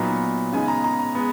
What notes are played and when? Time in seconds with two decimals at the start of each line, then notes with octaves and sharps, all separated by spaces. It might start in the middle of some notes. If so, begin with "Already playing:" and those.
Already playing: A#2 F#3 B3 D#4 A#5
0.52 C#3 G#3 B3 D#4 G#5
0.68 A#5
0.84 A#5
0.99 A#5
1.15 G#3 B3